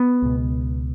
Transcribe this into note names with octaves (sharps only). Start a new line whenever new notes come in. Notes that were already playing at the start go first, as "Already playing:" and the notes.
Already playing: B3
C#2 B2